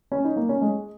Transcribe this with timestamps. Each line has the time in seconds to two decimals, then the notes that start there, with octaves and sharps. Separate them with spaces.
0.12 C#4
0.24 D#4
0.36 A#3
0.49 C#4
0.61 G#3